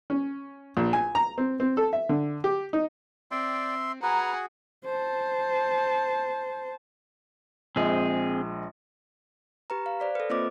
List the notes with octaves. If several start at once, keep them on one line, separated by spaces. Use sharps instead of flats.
C#4
A#1
G#5
A#5
C4
C4
A4
E5
D3
G4
D#4
C4 D5 E5 G5 C6
F#4 G#4 B4 F#5 G#5 A#5
C5 A5
A#1 G#3 C4 G#4
G4 B4 A#5
F5
C5 D5 B6
A4 B4
A#3 C4 F4 C5 D#5 D6